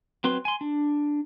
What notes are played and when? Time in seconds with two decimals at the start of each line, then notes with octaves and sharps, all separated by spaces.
0.24 F#3 C4 B4 C6
0.45 G#5 C6
0.61 D4